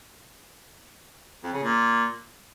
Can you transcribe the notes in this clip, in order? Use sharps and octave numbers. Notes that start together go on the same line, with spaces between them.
F2
C#3
A#2